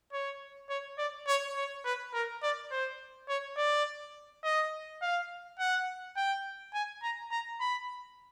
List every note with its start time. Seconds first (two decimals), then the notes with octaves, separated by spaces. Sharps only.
0.13 C#5
0.70 C#5
0.98 D5
1.28 C#5
1.56 C#5
1.85 B4
2.14 A#4
2.43 D5
2.71 C5
3.29 C#5
3.58 D5
4.44 D#5
5.02 F5
5.59 F#5
6.17 G5
6.74 G#5
7.03 A#5
7.31 A#5
7.61 B5